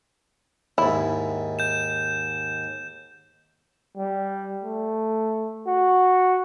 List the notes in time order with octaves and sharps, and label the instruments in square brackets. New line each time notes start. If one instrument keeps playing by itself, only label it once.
[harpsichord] D#2 G#2 [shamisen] E4
[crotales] G6 E7
[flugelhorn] G3
A3
F#4